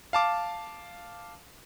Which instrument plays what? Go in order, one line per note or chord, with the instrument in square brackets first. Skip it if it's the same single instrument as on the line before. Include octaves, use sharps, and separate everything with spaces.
[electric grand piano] F5 A5 D6